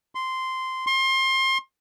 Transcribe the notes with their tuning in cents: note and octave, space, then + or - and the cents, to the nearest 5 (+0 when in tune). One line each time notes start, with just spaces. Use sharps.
C6 -10
C6 +30